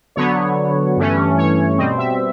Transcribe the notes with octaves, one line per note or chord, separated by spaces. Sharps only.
D3 F#3 B3 C#5
G2 E3 A3 C#4
C#5
B2 G3 C4 D#5
E5